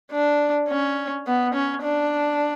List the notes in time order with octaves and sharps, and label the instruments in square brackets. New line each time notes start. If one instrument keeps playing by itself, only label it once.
[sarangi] D4
C#4
B3
C#4
D4